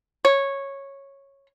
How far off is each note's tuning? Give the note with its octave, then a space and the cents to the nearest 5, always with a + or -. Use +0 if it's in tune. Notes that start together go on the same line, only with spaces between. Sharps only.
C#5 -10